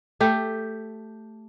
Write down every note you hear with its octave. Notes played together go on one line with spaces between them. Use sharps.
A3 G4